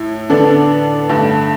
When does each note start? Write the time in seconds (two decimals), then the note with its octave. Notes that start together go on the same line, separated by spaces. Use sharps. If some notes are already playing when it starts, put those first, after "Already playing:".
Already playing: A2 E4
0.30 D3 B3 D4 A4
1.09 G2 D3 A3